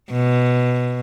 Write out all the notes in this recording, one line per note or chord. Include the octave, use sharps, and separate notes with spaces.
B2